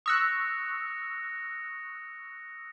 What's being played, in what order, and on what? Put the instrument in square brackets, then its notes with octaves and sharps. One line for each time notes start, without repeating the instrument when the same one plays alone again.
[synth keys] C#6 E6 F#6 [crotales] D#6 A#6 C#7